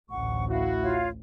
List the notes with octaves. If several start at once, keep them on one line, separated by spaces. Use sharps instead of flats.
A1 D2 F#5 C#6
E4 F#4 F5
F4 C#5 F5